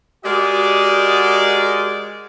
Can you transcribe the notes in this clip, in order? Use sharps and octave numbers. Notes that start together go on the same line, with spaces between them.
G#3 F#4 G4 A#4 D5 D#5